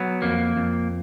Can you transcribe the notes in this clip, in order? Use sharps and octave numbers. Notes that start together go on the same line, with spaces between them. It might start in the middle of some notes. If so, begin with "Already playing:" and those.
Already playing: F#3 B3
F2 A#3
F2